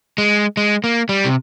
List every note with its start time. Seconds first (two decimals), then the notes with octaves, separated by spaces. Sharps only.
0.18 G#3
0.57 G#3
0.84 A#3
1.09 G3
1.25 C3